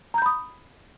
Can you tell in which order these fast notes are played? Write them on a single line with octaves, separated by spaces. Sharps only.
A#5 G6 B5 D#6